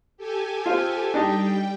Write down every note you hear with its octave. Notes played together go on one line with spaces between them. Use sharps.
G4 A4 G#5
C4 F4
G3 D4 D#4 G4 G5